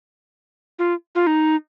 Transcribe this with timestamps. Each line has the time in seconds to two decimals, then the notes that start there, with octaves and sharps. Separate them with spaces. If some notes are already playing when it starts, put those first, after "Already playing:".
0.79 F4
1.15 F4
1.27 D#4